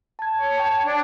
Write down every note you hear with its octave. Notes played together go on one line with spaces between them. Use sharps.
A5 G#6
C#5
G5 A5
D4